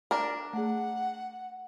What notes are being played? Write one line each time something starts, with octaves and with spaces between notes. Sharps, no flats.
D4 A#4
A3 G#4 F#5